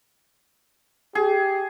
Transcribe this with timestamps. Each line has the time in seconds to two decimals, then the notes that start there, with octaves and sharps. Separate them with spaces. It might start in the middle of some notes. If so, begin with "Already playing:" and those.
1.15 G4 G#4